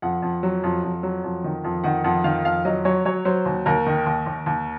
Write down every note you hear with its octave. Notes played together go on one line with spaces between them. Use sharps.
F2 F#5
F2
F#3
F2
F2
F#3
F2
D#3
F2
D#3 F#5
F2 F#5
D#3 F5
F2 F5
F#3 D#5
F#3 C#5
F#3 C#5
F#3 C5
D#2
D#2 A#4
D#3
D#2
D#2
D#2